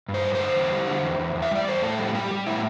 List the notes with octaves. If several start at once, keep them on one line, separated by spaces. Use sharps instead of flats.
G2
C5
G3
D3 C5
E2
G3
D3
E2
E2
E2
E5
G3 D5
E2 C5
A2 A4
G3
G3 G4
G3
A2 E4